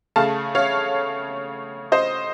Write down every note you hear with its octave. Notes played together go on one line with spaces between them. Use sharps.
C#3 A3 F5 A5
C#5 F5
C5 D#5